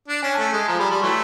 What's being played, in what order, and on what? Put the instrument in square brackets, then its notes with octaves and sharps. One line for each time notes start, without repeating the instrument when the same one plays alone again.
[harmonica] D4
[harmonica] C#4 [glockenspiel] G#5
[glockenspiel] A5
[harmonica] A3
[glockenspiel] A5
[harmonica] G#3
[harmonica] F3 [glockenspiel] A#5
[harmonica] G3 [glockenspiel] B5
[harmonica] G3 [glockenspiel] C6
[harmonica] E3 F#3 A3 [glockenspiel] C#6